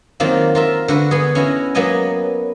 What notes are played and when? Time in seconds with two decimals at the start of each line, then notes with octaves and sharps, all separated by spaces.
0.20 D#3 F#3 A#3 C4 F4 D5
0.55 F4 A#4 E5
0.88 D3 F#4 B4
1.11 B3 G#4
1.35 C#4 E4 F#4 D#5
1.75 F#3 A#3 B3 D#5 G#5